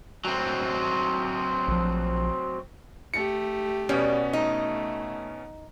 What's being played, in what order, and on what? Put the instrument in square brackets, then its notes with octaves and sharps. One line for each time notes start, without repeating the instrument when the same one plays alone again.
[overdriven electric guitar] F#3 C4
[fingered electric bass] A#1 F3
[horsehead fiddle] A3 G4 [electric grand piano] C#7
[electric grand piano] B2 B3 C#4 [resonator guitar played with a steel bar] G3
[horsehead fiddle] A3 [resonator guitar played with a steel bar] D#4